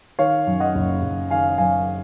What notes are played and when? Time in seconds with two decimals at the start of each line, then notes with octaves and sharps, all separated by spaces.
0.19 D#3 C#5 F5
0.47 F#2
0.60 D#5 F#5
0.75 F#1
1.02 F#1
1.30 D#3 F5 G#5
1.58 F#2 F5 G#5